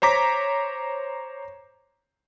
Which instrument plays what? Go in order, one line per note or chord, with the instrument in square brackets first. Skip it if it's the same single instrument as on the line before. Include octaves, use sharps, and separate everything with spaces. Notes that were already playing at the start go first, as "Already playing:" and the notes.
[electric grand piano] C5 C#5 A#5 D6 B6